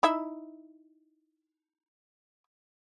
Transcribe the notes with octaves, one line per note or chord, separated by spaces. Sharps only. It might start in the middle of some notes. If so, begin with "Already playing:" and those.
D#4 E4 E5